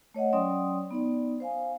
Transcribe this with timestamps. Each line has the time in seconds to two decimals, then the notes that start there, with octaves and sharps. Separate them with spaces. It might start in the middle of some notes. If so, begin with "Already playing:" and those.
0.14 A3 C#5 D#5 F#5
0.33 F#3 C#4 D5 G5 C6 D#6
0.91 B3 D#4 D5
1.40 C5 F5 G#5